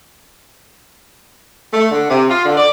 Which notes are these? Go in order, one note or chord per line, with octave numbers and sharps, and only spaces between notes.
A3
D3
C3
F4
D3
D5